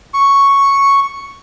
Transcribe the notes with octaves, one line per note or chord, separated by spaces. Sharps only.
C#6